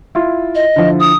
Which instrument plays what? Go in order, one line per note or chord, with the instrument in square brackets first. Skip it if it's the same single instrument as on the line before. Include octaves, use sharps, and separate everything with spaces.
[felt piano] E4 F4
[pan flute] D#5
[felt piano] D3 F3 E4
[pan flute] D#6